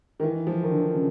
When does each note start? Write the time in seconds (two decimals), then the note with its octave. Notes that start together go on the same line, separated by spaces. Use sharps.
0.20 D#3
0.23 E3
0.47 F3
0.63 D#3
0.71 D3
0.95 C#3